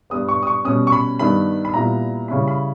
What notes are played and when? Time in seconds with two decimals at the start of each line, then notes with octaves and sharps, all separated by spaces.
0.10 G2 G3 B3 D#6
0.28 C#6
0.43 D#6
0.47 C#6
0.65 B2 G3 C#4 D#6
0.87 C#6
0.92 B5
1.19 G2 D#3 G3 B3 B5
1.65 B5
1.74 A#2 G3 B3 E4 A#5
2.28 C#3 G3 C#4 E4 B5
2.48 B5